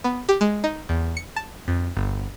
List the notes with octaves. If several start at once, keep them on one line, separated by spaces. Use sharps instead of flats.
B3
G4
G#3
D#4
E2
C#7
A5
F2
G1